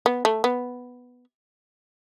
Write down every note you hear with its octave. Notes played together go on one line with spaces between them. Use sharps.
B3
A3
B3